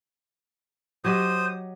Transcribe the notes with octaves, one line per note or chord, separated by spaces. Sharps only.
F#3 G4 C5 D#5 D#6